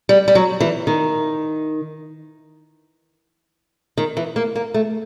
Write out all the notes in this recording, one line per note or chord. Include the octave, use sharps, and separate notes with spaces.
G3
G3
F#3
E3
D#3
D#3
E3
A#3
A#3
A3